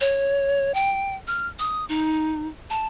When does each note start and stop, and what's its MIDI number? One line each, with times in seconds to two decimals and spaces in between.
0.01 0.72 73
0.74 1.15 79
1.27 1.47 89
1.59 1.85 87
1.89 2.48 63
2.70 2.87 81